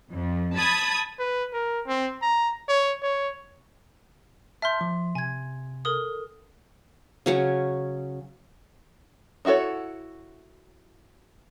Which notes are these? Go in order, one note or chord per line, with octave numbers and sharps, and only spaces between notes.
F2
A5 B5 D#6 G#6
B4
A#4
C4
A#5
C#5
C#5
E5 A5 C6 F6 G6
F3
C3 G#5 G#6
A4 A#4 D#6
C#3 F#3 C#4
D#4 E4 F#4 A4 C#5